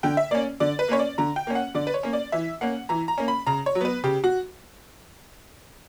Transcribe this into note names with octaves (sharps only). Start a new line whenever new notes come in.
D3 G5
E5
A#3 C#4 D5
D3 D5
B4
A#3 C#4 C#5
D5
D3 A#5
G5
A#3 C#4
F#5
D3 D5
B4
C#5
A#3 C#4
D5
E3 E5
A#3 C#4 F#5
E3 A#5
A#5
A#3 C#4
B5
C#3 A#5
C#5
F#3
B3 B4
C#3 G4
F#4